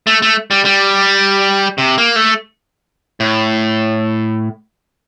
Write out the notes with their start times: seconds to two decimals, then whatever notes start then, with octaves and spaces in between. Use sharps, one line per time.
0.07 A3
0.22 A3
0.51 G3
0.65 G3
1.78 C3
1.98 A#3
2.16 A3
3.20 A2